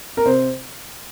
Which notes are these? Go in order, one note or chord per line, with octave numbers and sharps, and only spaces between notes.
A#4
C3 C5